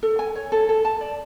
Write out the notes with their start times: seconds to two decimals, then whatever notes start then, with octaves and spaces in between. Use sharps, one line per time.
0.03 A4
0.19 G#5
0.35 C#5
0.52 A4
0.69 A4
0.85 A5
1.01 D5